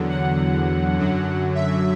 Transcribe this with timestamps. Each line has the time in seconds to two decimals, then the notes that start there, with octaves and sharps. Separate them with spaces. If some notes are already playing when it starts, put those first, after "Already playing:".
Already playing: E2 D3 F#3
0.09 F#5
0.97 F#2 D3 F#3
1.55 E5